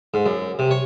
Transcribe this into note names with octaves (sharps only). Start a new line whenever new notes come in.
G#2
F#2
C3
C#5